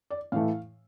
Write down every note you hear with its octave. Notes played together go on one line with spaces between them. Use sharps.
D5
A2 E3 A3 F5